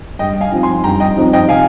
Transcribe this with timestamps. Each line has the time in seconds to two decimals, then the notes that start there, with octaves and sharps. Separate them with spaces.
0.19 G2 D#5 G5
0.41 F5 G#5
0.52 F3 C4 D#4
0.63 G#5 C6
0.84 G2 G5 A#5
1.00 D#5 G5
1.17 F3 C4 D#4
1.33 D#5 G5
1.49 C3 F5 G#5